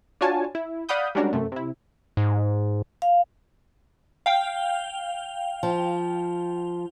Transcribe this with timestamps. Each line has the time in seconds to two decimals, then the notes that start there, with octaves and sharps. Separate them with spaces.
0.21 D4 F4 F#4 C#5 G#5 A5
0.55 E4
0.89 D5 F5 F#5 B5 D#6 G6
1.15 G3 G#3 C#4 D4 F#4 A#4
1.33 F#2 C3 A3
1.52 C3 E4
2.17 G#2
3.02 F5
4.26 F5 G5
5.63 F3